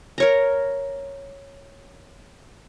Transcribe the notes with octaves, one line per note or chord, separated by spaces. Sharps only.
A#4 C#5 A#5